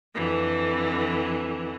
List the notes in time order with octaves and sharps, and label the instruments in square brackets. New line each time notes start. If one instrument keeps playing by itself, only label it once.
[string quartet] F2 D3 E3